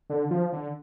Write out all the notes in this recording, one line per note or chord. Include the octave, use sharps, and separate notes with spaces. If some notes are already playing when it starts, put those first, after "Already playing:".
D3
F3
D3